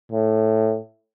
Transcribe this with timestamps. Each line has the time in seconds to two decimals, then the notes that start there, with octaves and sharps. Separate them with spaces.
0.12 A2